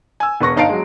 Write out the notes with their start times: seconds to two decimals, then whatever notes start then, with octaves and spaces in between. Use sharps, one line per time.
0.20 G#5 E6
0.40 E1 B4 C#6 A#6
0.57 G1 D#4 F5 A5 C7 D7
0.69 F#3 G#3